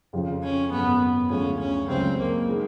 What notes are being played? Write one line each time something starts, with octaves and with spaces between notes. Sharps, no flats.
F2 C#3 F3
C#4
G#1 F#2 C#3 B3
D2 D3 F3 G#3 C#4
C#4
C#2 C#3 F#3 C4
A#3
D#3 G#3 B3